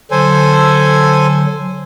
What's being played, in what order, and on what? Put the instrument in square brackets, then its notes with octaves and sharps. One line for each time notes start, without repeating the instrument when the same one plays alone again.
[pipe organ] D3 F#3 [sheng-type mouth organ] A4 C5 G#5